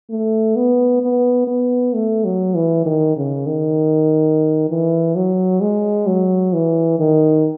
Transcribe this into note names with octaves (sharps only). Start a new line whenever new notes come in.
A3
B3
B3
B3
A3
F#3
E3
D#3
C#3
D#3
E3
F#3
G#3
F#3
E3
D#3